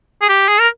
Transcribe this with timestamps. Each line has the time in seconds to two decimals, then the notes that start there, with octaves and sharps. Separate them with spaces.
0.22 G#4
0.29 G4
0.48 G#4
0.60 A#4